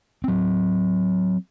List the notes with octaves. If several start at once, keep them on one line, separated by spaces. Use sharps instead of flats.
F#3 C4